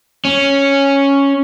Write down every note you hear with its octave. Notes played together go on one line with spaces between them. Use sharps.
C#4